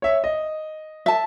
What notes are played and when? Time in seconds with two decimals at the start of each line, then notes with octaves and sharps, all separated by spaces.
0.02 C#5 E5
0.24 D#5
1.06 E5 A5